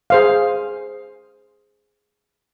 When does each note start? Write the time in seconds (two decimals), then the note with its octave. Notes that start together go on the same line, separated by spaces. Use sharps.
0.10 G#4 C5 F5